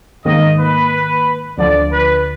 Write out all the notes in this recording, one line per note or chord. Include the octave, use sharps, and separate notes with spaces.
G#2 D#3 A#3 D#5
B4
D2 D3 F3 D5
B4